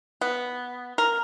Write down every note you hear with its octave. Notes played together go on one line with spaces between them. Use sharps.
B3
A#4